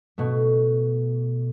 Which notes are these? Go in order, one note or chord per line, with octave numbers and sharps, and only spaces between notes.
B2 A3